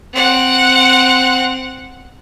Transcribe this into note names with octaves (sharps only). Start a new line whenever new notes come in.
C4 F#5